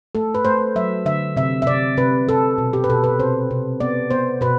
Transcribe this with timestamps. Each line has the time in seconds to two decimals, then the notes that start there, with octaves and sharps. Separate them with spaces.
0.15 A3 A4
0.35 B4
0.45 A3 C5
0.76 F#3 E5
1.06 D3 E5
1.36 C3 E5
1.62 E5
1.67 C3 D5
1.97 C3 B4
2.28 C3 A4
2.58 B2
2.73 G4
2.84 B4
2.90 B2 A4
3.04 B4
3.19 C3 C5
3.51 C3
3.80 B3 D5
4.11 B3 C5
4.41 B2 B4